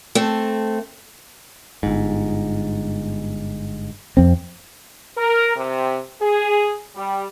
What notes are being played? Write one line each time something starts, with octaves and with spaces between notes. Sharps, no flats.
A3 C4
G1 G#2
F2 C4
A#4
C3
G#4
G3